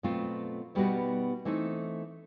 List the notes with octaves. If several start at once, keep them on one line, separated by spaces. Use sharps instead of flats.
B2 F#3 A3 C4 F4
B2 G3 B3 D#4 F#4
E3 A3 C4 D#4